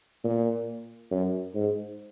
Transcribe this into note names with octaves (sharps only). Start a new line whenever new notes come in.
A#2
F#2
G#2